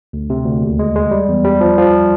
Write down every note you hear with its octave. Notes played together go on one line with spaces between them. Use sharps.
D2
C3
D2
D#2
G#3
G#3
G3
E2
G3
F3
F3